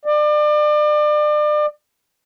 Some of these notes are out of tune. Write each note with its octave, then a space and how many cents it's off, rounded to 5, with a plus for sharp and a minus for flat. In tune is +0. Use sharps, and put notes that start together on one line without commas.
D5 +35